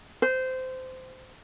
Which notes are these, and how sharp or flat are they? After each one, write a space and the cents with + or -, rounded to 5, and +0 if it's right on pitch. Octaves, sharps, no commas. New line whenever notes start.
C5 -20